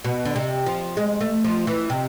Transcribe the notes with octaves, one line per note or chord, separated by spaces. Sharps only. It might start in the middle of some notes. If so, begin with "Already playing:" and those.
B2
D3
C3
F3
G#3
A3
F3
E3
C3